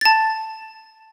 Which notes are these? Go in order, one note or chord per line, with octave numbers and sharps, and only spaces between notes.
A5 A6